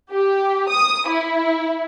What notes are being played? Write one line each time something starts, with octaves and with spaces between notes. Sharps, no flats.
G4
D#6
E4